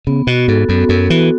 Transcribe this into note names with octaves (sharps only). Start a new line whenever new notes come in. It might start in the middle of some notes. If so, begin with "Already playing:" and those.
C#3 B3
B2 F#4
G#2 A4
F#2 B3
F#2 B3
E3 F#4